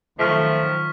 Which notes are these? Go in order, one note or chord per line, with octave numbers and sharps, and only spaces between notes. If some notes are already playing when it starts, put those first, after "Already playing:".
D#3 F3 F#3 A3 C#6 F6 B6